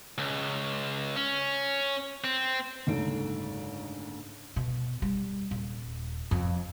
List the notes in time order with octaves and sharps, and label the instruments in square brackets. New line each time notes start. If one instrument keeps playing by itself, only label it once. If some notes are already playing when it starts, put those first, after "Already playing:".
[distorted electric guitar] C#2
C#4
C4
[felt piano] F#1 D2 G#2 D#4 A4 D7
[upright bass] B2
G3
D#1
F2